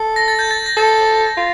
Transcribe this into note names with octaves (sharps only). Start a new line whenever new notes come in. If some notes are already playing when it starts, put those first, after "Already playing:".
Already playing: A4
A#6
A6
G6
A6
A#6
A4 A6
F4